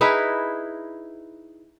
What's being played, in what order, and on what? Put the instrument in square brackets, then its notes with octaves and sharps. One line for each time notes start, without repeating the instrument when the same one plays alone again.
[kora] D#4 E4 G#4 B4